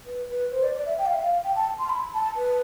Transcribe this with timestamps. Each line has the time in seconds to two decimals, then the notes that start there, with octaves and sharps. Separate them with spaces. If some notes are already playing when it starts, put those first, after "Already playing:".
0.06 B4
0.29 B4
0.51 C5
0.63 D5
0.74 D5
0.86 E5
0.98 G5
1.06 F5
1.13 E5
1.22 F5
1.44 G5
1.55 A5
1.79 C6
1.89 B5
2.14 A5
2.36 B4